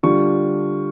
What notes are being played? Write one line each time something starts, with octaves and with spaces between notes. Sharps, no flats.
D3 G3 D4 F4 C#6